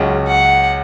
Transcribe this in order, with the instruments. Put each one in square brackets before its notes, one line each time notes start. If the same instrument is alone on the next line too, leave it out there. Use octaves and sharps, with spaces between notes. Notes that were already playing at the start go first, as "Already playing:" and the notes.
Already playing: [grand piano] C#2 C#3 F#3 C#4
[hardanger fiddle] F#5